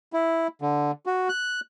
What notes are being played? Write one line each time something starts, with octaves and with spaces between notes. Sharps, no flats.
E4
D3
F#4
F#6